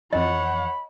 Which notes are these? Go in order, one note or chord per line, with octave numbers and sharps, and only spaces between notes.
F2 E3 C#5 D#5 F#5 B5